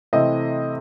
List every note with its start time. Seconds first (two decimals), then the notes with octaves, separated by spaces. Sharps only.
0.13 C3 E3 A3 C4 E4 D#5